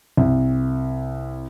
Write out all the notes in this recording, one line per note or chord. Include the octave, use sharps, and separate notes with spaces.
C2